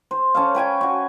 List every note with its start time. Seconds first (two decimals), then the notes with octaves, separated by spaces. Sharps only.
0.11 C5
0.35 C#4 A4 F5
0.55 B4 G5 G#5 C#6
0.81 F#4 C#6